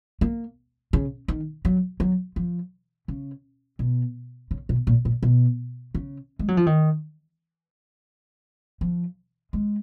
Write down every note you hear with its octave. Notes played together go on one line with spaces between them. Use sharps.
A#3
C#3
D#3
F#3
F#3
F3
C#3
B2
C#3
B2
A#2
A#2
B2
C#3
G#3
F#3
F3
D#3
F3
G#3